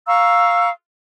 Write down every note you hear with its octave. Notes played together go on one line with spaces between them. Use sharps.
F5 A#5 C#6 E6